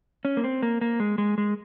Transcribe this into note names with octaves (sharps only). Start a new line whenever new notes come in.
C#4
A#3
C4
A#3
A#3
G#3
G#3
G#3